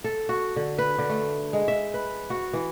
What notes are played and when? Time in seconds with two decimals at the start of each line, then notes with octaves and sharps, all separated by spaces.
0.04 A4
0.29 F#4
0.56 D3
0.78 B4
0.98 D3
1.10 A3
1.53 G#3
1.68 E5
1.94 B4
2.30 F#4
2.54 E3